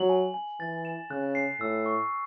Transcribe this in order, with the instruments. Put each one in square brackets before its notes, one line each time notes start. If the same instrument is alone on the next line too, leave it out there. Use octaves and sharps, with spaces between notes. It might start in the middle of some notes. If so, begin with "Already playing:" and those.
Already playing: [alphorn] F#3 [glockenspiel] F#7
[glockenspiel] G#5
G#5
[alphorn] E3 [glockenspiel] A6
[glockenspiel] E7
[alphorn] C#3 [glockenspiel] F#6
[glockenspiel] C7
[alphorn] A2 [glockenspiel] E6
[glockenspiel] C#6